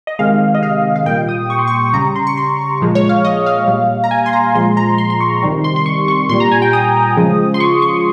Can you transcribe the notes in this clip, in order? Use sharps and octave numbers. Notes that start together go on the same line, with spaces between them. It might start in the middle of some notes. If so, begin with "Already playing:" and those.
D#5
C3 D#3 G#3 F5
D#5
F5
F5
A#2 G3 G5
D#6
C#6
C6
C#6
C#3 G3 A#5
C6
C#6
C6
A#2 F3 G#3
C#5
F5
D#5
F5
A#2 G3
A#5
G#5
C6
A#5
A#2 F3 G#3 C6
A#5
C6
C6
C#6
C3 D#3 G3
C6
C6
C#6
C#6
A#2 G3 C6
A#5
G#5
G5
D#6
C#3 F3 G#3
C6
C#6
C#6